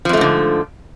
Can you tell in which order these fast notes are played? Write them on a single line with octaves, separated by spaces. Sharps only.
F3 F2 A3 G#2 D3